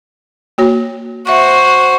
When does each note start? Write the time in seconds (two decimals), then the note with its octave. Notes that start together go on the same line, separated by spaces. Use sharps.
0.58 A#3 F#4 C#5
1.27 F#4 C5 E5 C#6